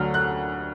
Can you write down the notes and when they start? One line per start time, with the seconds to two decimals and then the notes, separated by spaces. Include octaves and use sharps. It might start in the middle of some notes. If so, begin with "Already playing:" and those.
Already playing: D2 D3 F#3 F6
0.14 F#6